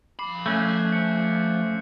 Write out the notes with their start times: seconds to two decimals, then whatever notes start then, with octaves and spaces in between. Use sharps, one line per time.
0.19 F3 B5 D6 C7
0.46 A3 C#4 E6 F#6 G6
0.93 C#7